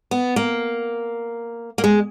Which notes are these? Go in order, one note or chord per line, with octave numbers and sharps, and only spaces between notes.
B3
A#3
A#3
G#3